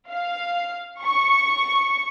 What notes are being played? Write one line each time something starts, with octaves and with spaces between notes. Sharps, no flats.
F5
C#6